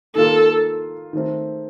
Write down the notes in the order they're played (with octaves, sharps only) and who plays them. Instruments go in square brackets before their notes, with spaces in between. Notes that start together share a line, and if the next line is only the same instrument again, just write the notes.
[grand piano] D#3 A#3 F4 [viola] A4
[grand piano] D#3 A3 C4